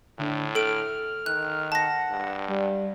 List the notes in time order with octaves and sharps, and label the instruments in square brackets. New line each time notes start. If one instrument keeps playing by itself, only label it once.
[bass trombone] A2 [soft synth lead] D3
[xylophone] A4 D7 [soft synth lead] F6
[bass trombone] D#3 [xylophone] F#6
[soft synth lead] F#5 [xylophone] A5 A#6
[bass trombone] G2
[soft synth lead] G3